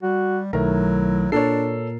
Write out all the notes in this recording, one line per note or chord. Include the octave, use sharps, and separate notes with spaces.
G3 F#4
B1 D#3 F#3 A3 E4 A#4
A#2 D4 A4 A#4 C#5 C7